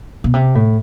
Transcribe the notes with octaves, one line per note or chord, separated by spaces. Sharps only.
B2
C3
A2